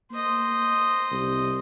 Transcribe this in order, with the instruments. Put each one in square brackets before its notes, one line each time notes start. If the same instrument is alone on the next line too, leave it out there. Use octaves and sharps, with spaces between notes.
[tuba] A#3 [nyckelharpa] C5 D#5
[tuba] C2